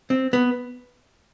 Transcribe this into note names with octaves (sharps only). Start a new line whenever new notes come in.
C4
B3